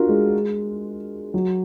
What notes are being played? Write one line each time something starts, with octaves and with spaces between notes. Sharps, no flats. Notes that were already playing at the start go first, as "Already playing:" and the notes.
Already playing: D4 F4 F#4 A#4
G#3
F#3